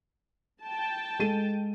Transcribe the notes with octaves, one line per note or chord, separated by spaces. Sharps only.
G5 A5
G#3 A4 D#7